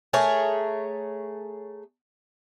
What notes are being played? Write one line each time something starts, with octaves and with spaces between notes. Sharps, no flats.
A3 G#4 A#4 C#5